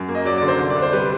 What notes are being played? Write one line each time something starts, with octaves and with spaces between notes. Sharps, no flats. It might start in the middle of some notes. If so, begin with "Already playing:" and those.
Already playing: F#2
A#3
D#5
F#3 D5
D5
D3
C5
C2
D5
C2
C5
G3 B4